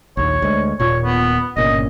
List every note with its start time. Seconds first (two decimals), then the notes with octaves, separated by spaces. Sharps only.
0.17 A#1 D#2 C#5
0.42 D2 G#3
0.80 D#1 A#2 C#5
1.04 B3
1.57 G1 A#2 C#3 D#5